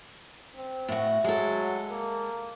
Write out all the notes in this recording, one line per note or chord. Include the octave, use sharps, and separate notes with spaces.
C4
A2 F#4
F#3 G#3 A4
A#3